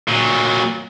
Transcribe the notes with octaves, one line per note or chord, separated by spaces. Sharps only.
A#2 F#3